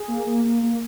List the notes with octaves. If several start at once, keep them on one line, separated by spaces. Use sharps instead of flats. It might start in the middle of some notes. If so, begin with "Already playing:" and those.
Already playing: G#4
A#3
A#3
A#3
A#3